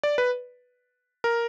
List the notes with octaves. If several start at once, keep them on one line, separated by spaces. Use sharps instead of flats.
D5
B4
A#4